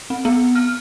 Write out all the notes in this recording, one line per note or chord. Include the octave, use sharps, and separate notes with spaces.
C4
B3
F6